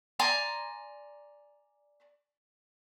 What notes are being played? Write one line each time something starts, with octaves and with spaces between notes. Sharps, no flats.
D5 G#5 A#5 C6